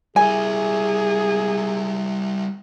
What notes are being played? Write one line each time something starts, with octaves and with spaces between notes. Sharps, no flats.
G3 E4 G#4 G#5